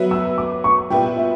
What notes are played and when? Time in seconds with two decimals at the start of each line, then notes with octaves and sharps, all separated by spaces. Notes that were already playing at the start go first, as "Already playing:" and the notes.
Already playing: F#3 B3 F#4 B4 E5
0.11 E6
0.38 D6
0.64 C#6
0.90 A#2 G3 B3 E4 B4 G5
1.17 E5